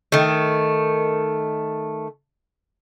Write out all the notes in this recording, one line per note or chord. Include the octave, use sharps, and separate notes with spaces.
D#3 A3